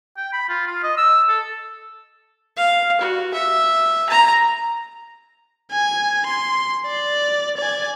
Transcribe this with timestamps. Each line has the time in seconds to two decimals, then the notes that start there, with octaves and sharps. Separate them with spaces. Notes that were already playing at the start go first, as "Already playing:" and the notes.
0.17 G5
0.33 B5
0.49 F4
0.67 F4
0.83 D#5
0.97 E6
1.29 A4
2.57 F5
3.01 F#4
3.34 E5
4.09 A#5
5.72 G#5
6.27 C6
6.86 D5
7.58 D5 G#5